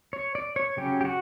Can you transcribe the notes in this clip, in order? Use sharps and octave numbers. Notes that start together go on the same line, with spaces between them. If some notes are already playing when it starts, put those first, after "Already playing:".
C#5
D5
C#5
C#3 F#3 C#4 G4
G4
F#4